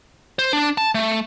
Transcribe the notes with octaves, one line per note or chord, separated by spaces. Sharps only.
C5
D4
A5
A3